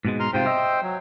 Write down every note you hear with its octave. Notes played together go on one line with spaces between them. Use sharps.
G#2 B2 G#3
A#5 C6 F6
G#2 C3 F4 C5 G5
D#5 E5
F#3